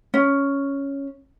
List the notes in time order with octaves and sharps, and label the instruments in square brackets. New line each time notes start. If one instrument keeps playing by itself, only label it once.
[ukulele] C#4